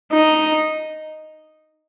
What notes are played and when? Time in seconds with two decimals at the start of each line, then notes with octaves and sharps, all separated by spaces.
0.13 D#4